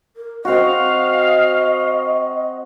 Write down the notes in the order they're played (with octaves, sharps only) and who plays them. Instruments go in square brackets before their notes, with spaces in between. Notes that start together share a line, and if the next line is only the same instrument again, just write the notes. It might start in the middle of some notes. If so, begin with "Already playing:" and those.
[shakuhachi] A#4
[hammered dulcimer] C4 F#4 [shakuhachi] D#5 [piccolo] F5